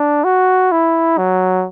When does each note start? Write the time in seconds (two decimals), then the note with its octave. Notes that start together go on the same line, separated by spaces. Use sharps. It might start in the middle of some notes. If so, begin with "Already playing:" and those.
Already playing: D4
0.24 F#4
0.72 E4
1.18 F#3